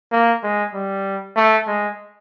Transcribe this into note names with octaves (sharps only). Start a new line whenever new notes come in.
A#3
G#3
G3
A3
G#3